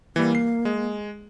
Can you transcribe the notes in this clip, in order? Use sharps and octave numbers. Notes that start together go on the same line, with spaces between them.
E3 G3 A#3
C7
G#3